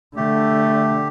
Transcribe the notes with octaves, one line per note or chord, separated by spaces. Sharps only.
D3 A3 G4